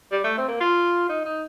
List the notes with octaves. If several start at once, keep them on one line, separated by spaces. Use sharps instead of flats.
G3
A3
C4
A#3
F4
D#4
D#4